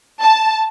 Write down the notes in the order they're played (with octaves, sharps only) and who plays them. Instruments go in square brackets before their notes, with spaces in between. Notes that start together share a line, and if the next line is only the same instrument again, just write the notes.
[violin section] A5